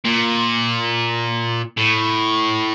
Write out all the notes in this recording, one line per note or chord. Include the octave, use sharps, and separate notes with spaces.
A#2
A2